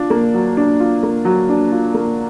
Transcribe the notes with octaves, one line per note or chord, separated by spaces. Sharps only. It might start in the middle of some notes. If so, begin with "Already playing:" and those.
Already playing: D4 F4
A#3
F#3
D4
F4
A#3
F#3
D4
F4
A#3